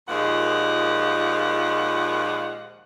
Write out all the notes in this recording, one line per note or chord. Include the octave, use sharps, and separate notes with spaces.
D#2 A#2 F3 G#3 F#5